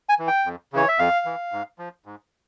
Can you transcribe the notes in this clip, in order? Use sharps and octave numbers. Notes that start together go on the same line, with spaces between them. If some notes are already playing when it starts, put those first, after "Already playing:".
G#5
E3
G5
F2
C#3 E3 C#5
E5
F2 F5
E3
G#2
F3
G#2